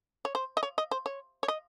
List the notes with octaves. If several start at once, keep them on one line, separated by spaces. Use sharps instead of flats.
C#5
C5
D#5
C#5
D#5
C5
C#5
C#5
D#5